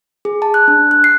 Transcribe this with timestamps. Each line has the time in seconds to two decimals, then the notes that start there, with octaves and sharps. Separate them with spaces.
0.25 G#4
0.42 A5
0.54 F#6
0.68 D4
0.91 F#6
1.04 C7